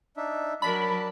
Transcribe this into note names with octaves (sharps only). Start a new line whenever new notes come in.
D4 D#4 E5
F#3 D4 A#4 A5 B5